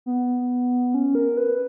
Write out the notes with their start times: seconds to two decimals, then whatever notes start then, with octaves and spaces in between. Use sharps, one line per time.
0.06 B3
0.94 C#4
1.15 A#4
1.37 B4